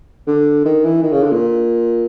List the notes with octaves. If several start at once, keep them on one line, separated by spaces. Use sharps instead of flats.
D3
D#3
E3
D#3
C#3
D3
A#2